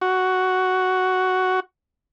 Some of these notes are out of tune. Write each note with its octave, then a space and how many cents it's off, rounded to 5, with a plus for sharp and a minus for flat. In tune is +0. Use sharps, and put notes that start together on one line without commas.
F#4 +5